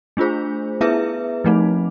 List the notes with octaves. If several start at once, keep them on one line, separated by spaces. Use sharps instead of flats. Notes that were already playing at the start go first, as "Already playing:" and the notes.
A3 D4 F4 G#4 C5
B3 E4 G#4 B4 E5
F3 A3 C4 D#4